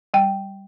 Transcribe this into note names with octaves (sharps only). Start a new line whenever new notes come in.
G3 G5